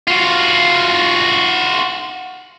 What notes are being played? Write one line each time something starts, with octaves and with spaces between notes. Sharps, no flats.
F4 F#4